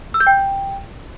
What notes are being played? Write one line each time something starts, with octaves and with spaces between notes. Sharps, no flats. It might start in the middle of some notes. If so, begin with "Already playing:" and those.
E6
G6
G5